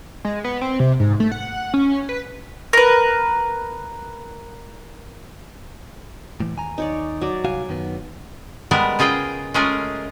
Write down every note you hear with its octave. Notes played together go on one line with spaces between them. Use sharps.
G#3
B3
C4
C3
G#2
A3
F#5
C#4
B4
A#4 B4
A2 E3
D#2 G#5 A#5
D#4 C#5 D5
F#3 D5
C2 F#4 F5 G#5
F#2 D#3 B3
G3 G#3 B3 A#4
C#3 F4 G#4 D#5 G5
G#3 A3 C#4 F4 G#4 A#4